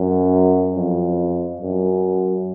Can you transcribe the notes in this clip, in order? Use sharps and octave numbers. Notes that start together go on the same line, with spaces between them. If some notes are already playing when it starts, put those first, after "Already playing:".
Already playing: F#2
F2
F#2